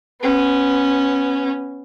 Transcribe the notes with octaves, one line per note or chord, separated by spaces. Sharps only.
B3 C#4